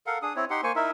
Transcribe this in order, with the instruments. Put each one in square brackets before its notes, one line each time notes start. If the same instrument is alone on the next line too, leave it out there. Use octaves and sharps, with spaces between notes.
[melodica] A4 A#4 F5 F#5
D4 G#4 D#6
C4 E4 C#5
D#4 G4 F#5 C6
A#3 C5 G#5 C#6
D#4 E4 A#4 E5